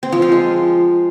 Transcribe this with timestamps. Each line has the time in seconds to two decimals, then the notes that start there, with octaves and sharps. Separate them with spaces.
0.03 C4
0.12 F3
0.22 F4
0.32 G#3